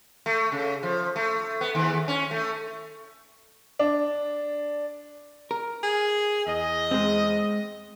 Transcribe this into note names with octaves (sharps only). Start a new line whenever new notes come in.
A3
C#3
F3
A3
B3
D#2
C#4
A3
D4
A#4
G#4
E2 D#5
G#3 C4